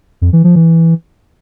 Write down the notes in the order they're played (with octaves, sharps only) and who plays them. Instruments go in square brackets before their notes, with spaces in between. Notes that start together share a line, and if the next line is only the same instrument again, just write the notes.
[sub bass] F2
E3
F3
E3